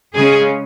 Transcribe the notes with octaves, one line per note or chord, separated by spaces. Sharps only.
C#3 G#3 C#4 G#4